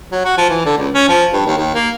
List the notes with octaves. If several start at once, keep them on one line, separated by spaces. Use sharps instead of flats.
F#3
F#4
F3
E3
D3
C#2
C#4
F3
G2
D#2
D#2
A#3